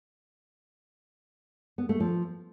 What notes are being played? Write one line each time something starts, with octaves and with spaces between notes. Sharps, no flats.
B3
A3
F3